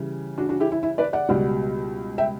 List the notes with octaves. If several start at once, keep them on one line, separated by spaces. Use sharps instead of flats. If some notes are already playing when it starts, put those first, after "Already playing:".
Already playing: C#3 E3 G3
D4 F#4
D4 F#4
E4 G4
E4
E4
B4 D5
D5 F#5
C#2 B2 G3
E5 G5